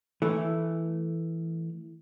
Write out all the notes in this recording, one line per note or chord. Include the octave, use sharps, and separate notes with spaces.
E3 A3